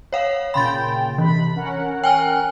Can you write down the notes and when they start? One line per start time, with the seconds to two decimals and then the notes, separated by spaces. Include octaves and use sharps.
0.13 C#5 F5 F#5
0.54 A#2 C#3 G5 B5 C6 A6
1.18 C3 E3 B5
1.56 C#4 A#4 F#5
2.04 G5 G#5 F6